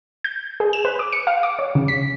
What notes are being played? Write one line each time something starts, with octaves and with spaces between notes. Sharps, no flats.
G6
G#4
E7
B4
D6
C#7
F5
D6
C#5
C#3
B6